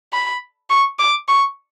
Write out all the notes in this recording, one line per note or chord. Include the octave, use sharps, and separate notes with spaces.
B5
C#6
D6
C#6